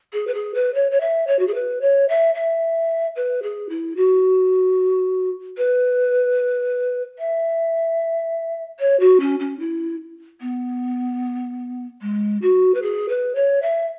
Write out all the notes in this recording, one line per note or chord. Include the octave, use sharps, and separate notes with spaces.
G#4
B4
G#4
B4
C#5
C#5
E5
C#5
F#4
G#4
B4
C#5
E5
E5
B4
G#4
E4
F#4
B4
E5
C#5
F#4
C#4
C#4
E4
B3
G#3
F#4
B4
G#4
B4
C#5
E5